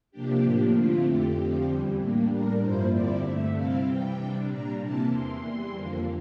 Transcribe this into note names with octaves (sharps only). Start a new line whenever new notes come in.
C3 F3 A#3 D4 G4
A2 F3 A#3 D4
D3 A3 C4 E4 F4
F2 D3 A3 G4
D3 F3 C4
E2 E3 G3
A2 G3 A#3 D4
A2 G3 D4 A#4
G2 F3 A#3 E4 C5
E2 D3 G3 C4 E4 D5
G2 D3 A3 E5
C3 G3 C4 E4 F5
C3 E3 G3 G5
C3 G3 D4
A#2 G3 D4 A#5
C3 E3 A#3 E4 A5
E2 E3 A#3 C6
E2 E3 G3
F2 D3 F3 A#3